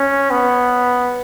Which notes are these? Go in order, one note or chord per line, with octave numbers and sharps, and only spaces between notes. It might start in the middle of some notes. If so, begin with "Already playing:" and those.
Already playing: C#4
B3